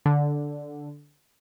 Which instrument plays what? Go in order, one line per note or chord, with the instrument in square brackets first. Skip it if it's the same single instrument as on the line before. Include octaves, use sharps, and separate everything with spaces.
[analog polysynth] D3